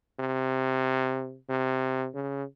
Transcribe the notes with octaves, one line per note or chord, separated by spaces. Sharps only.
C3
C3
C#3